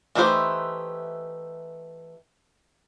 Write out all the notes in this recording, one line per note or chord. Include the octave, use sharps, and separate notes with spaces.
E3 A3 D#4 G4 C5